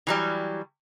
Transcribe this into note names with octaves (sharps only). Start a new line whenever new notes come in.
E3 F#3 G3